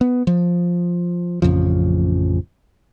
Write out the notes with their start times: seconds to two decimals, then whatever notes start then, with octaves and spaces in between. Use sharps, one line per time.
0.01 B3
0.27 F3
1.42 A1 F2 C#3 F3